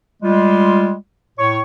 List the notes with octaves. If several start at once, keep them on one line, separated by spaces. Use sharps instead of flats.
G3 G#3 F4
A2 C#5 C#6